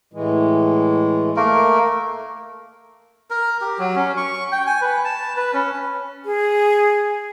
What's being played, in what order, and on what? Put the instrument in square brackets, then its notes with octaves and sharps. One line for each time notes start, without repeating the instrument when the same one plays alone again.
[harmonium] A2 E3 G#3
[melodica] A3 A#3 A#4
A#4
G4
F#3
C#4
C#6
G5
G#5
B4
A5
B4
C#4
[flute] G#4